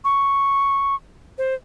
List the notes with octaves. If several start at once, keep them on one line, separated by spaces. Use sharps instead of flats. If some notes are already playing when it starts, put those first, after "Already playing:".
C#6
C5